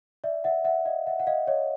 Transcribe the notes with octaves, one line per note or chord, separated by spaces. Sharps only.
D5 E5
E5 F#5
E5 F#5
D#5 F5
E5 F#5
F#5
D#5 F5
C#5 D#5